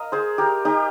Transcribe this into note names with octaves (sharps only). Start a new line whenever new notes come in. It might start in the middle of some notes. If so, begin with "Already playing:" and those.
Already playing: A#4 D#5 F5
G#4 C5
G4 A#4
D#4 G4